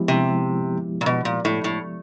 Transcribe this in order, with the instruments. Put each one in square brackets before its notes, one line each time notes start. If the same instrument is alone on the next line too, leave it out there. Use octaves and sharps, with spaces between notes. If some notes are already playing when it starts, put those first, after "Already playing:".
Already playing: [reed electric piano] F3 G#3 B3 E4 G4
[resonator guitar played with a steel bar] C3
A#2
B2
A#2
A2
A2